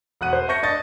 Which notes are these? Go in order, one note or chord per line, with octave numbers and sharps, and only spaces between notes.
E1 F#5 F#6 D#7
C5
E5 A5 C#6 G6 A#6 C#7
D4 D#5 A6